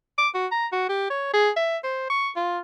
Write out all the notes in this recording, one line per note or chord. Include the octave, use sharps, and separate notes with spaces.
D6
F#4
A#5
F#4
G4
C#5
G#4
E5
C5
C#6
F4